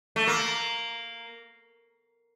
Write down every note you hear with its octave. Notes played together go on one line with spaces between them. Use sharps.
A3
A#3